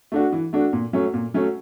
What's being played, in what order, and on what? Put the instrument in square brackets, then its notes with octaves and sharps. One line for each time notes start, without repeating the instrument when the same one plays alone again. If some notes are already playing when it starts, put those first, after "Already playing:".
[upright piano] A3 D4 F#4
E3
A3 D4 F#4
A#2
F#3 A3 C#4
A#2
F#3 A3 C#4